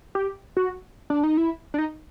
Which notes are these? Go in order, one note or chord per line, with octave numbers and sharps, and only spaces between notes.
G4
F#4
D4
D#4
E4
D4
D#4